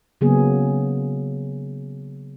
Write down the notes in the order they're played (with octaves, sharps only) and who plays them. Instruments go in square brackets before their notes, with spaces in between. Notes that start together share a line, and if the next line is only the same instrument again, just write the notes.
[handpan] C#3 F#3 A#3 B3 G#4